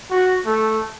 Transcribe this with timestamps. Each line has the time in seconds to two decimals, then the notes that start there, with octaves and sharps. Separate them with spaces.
0.11 F#4
0.46 A3